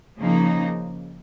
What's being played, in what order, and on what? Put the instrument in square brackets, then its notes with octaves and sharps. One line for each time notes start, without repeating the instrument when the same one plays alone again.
[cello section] C#3 F3 A#3 D#4